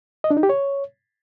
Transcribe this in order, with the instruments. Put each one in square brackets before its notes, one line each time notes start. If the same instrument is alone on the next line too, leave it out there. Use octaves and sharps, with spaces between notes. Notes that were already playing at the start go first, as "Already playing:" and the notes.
[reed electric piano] D#5
D4
D#4
G4
C#5